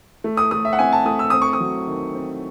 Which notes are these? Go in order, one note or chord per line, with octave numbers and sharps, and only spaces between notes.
A3
D#6
A3 D#6
E5
F#5
C4 G#5
A5
A3 D#6
E6
C4 D#6
C#6
D#6
F#3
D#3
C4